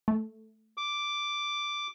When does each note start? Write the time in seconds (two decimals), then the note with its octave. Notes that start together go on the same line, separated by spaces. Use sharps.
0.08 A3
0.77 D6